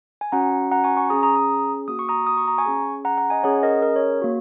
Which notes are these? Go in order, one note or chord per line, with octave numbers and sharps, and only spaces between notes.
G#5
C#4 F#4 F#5 A#5
F#5 A#5
G#5 C#6
G#5 C#6
C#4 G#4 A#5 D#6
A#5 D#6
A#5 D#6
A#3 F#4 D#6
C#6
A#5 D#6
D#6
C#6
A#5
G#5 C#6
C#4 G#4
F#5 A#5
F#5 A#5
D#5 G#5
C#4 G#4 C#5 F#5
A#4 D#5
A#4
C#5
A#3 F#4